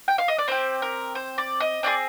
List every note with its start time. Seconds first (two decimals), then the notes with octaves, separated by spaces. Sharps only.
0.08 G5
0.18 F5
0.28 D#5
0.38 D5
0.48 C4 G4 C5
0.82 A#4
1.15 C5
1.38 D5
1.60 D#5
1.83 C4 F4 G#4 D5